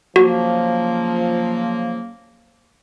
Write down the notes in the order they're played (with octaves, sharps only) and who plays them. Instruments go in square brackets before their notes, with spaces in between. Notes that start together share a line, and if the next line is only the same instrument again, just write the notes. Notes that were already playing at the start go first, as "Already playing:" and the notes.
[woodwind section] C#3 F#3 A#3 [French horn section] F3 [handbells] F#4